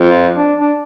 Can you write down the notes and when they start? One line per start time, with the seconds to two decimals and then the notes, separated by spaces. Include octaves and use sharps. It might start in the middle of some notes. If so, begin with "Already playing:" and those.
Already playing: F2
0.10 F4
0.36 D4
0.60 D4